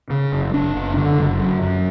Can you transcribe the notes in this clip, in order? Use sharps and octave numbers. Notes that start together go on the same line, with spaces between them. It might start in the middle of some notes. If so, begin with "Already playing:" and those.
C#3
F#1
F#1 D4
F#1
D3
F#1
F#2
F#2